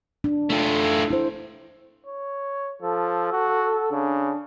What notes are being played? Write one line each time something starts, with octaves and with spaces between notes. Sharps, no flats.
D4
A3 F4
E4 C5
C#5
F3 A4
F#4
C#3 D4